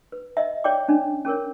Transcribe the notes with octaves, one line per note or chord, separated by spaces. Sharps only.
B4
D#5 E5
G#4 C#5 D5 G5 D6
C#4 D4
C#4 G#4 A#4 C#5